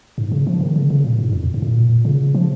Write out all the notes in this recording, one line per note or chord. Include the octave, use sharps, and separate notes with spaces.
G#2
C#3
F3
D#3
C#3
C#3
A#2
G#2
F2
G#2
A#2
C#3
F3